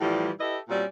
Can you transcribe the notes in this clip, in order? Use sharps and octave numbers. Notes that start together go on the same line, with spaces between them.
A2 E3 F3 G3
E4 G4 A4 B4 D#5 E5
A#2 G3 C4 C#4 F#4 D5